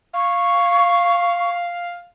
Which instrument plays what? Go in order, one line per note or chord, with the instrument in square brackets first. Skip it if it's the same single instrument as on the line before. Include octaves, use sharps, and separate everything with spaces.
[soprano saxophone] F5 [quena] C#6